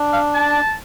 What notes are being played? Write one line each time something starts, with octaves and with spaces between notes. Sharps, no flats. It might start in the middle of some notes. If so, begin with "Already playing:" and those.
Already playing: D4
F5
A5